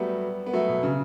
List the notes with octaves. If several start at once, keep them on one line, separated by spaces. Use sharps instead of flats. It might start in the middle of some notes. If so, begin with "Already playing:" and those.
Already playing: F#3 G3 A3 B3
B3
F#3 A3
B2
C#3